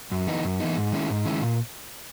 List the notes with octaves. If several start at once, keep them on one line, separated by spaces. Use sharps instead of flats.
F#2
E3 B3 D#4
F#2
E3 B3 D#4
G#2
D#3 G#3 C#4 E4
G#2
D#3 G#3 C#4 E4
A#2